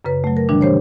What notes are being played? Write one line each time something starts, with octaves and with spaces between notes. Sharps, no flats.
F#2 C#3 B4
F#3 A3
A#4
A#2 D3 E3 G3 D4
G4 C5 C#5